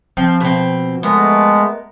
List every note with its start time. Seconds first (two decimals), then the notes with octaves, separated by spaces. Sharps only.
0.17 F3 C4
0.40 B2 C4
1.03 G#3 A3 B3 A#4